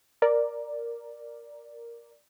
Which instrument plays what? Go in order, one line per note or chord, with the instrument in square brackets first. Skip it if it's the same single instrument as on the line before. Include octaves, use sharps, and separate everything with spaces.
[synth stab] A#4 D5